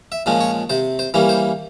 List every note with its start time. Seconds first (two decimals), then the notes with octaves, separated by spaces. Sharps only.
0.12 E5
0.26 A#2 F3 G#3 C#4
0.41 C#5
0.70 C3 C5
0.99 C5
1.14 E3 G3 A#3 C#4
1.29 C5